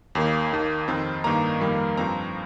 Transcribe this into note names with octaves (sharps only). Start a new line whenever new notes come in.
D#2 D#3 A#3
D#2 D#3 A#3
F2 D#3 C4
G2 D#3 A#3 A#5
F2 D#3 G3 A#3
G2 F3 C4 A#5